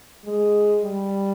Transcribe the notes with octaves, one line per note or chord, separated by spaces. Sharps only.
G#3
G3